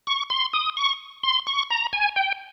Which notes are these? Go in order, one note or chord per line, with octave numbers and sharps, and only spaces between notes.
C#6
C6
D#6
C#6
C6
C#6
A#5
G#5
G5